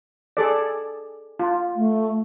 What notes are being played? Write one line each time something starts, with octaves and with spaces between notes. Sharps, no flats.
G#4 A4 D5
F4
A3